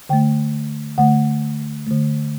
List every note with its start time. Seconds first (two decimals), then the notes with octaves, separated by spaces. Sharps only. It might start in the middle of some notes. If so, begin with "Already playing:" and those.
0.09 D3 A3 G5
0.98 D3 A3 F#5
1.87 D3 A3